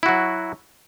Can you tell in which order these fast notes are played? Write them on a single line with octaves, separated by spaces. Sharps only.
E4 F#4 F#3